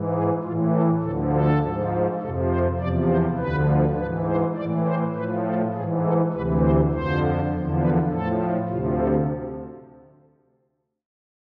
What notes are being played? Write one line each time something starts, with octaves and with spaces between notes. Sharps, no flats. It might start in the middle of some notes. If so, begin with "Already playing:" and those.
Already playing: G#2 E3
G#4
A2 E3 F4
A4
D2 D3 F3 A4
A4
G#2 F3
F2 C3 F3 A4
C5
E2 C3 F3 D5
C5
D2 D3 F3 B4
G#2 E3 B4
C5
A2 E3 D5
C5
A2 F3 B4
A4
G#2 E3 G#4
A4
D2 C3 E3 B4
C5
F2 D3 F3 C5
E2 D3 F3
B4
A2 F3 A4
D2 C3 F3 F4
A4